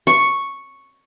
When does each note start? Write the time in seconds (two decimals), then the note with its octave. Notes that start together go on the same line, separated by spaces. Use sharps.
0.07 C#6